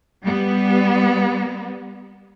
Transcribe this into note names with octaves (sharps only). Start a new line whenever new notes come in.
G3 B3